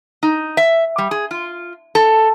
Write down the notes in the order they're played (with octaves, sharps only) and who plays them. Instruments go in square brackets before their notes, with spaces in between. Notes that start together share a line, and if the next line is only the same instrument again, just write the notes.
[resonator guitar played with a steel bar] D#4
E5
G3
G#4
F4
A4